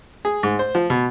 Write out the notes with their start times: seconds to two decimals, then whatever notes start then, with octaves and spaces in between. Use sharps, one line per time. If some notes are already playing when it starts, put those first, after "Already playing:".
0.25 G#4
0.43 G#2
0.59 C5
0.75 F3
0.90 B2